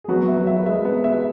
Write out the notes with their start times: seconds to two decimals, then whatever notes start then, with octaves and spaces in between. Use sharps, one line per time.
0.04 G#4
0.08 F#3 B3 F#4
0.28 E5
0.37 F#3 F#4
0.47 E5
0.59 B4
0.66 G#3 G#4 E5
0.85 B3
1.04 E5